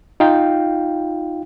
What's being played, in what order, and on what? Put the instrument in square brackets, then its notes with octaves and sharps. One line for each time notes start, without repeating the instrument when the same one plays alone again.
[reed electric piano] D#4 F4 F5 G5